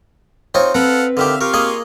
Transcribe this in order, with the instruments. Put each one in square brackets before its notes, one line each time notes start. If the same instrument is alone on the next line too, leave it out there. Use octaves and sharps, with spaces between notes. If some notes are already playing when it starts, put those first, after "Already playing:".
[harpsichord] C4 D#4 F4 [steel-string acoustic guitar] C5 [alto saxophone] C#5
[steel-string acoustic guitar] C4 [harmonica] A4 F5 F#5 [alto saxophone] B4 [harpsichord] A#5 B5
[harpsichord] D3 D#3 G4 [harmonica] E5 F5
[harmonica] F4 F5 C#6 [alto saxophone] G4 [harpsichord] A#4
[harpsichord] A#3 G#4 D#5